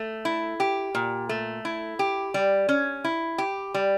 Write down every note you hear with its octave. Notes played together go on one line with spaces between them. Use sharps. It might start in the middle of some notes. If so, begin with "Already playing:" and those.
Already playing: A3
E4
G4
A#2
A3
E4
G4
G3
C#4
E4
G4
G3